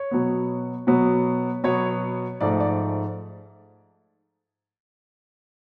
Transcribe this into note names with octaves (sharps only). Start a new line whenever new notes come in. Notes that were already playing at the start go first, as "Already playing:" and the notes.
Already playing: C#5
B2 F#3 B3
B2 F#3 B3
B2 F#3 B3 C#5
G#2 F3 A3 D5
D5